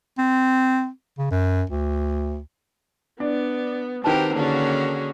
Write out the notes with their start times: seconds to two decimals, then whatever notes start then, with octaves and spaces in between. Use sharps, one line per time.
0.18 C4
1.18 C#3
1.31 F#2
1.69 D2
3.20 B3 D4
4.04 D#3 C4 F#4 G4 A#4 B4 A5
4.34 D3 A#3 C#4 F#4 G#4